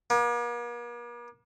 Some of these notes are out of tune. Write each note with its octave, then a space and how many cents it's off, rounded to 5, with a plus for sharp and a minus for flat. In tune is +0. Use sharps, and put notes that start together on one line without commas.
A#3 +45